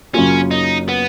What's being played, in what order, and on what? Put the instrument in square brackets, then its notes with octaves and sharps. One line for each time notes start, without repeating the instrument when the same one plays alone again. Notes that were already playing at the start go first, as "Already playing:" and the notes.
[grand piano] F#2 C#3 F#3 A#3 F4 [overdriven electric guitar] C#4
[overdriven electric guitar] D#4
B3